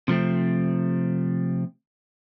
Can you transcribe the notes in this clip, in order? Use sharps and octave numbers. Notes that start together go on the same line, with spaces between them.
C3 F3 A3 C4